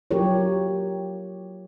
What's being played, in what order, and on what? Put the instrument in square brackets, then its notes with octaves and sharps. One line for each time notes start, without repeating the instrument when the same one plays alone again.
[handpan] F#3 A#3 F4 G4 A#4 C#5